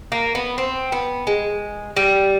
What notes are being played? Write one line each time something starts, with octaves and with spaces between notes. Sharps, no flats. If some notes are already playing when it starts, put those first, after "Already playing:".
A#3
B3
C4
B3
G#3
G3